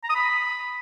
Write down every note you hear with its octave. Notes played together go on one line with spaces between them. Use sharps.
A#5
D#6
B5